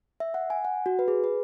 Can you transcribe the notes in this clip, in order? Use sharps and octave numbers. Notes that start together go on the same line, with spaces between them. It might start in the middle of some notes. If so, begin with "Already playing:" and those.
E5
F#5
G#5
F#5
F#4
B4
G#4
B4